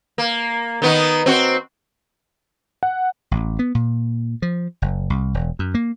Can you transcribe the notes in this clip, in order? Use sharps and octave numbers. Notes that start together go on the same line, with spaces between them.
A#3
D#3 B3 D#4
C4 F#4
F#5
A1
B3
A#2
F3
F#1
C2
E1
F#2
A#3